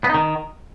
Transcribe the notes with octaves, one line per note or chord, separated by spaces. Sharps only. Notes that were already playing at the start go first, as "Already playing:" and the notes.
B3
D#4
D#3